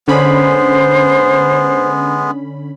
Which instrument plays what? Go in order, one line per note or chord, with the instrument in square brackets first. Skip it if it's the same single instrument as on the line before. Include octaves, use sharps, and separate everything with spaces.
[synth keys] D3 C#4 B5 [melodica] G#3 B3 [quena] C5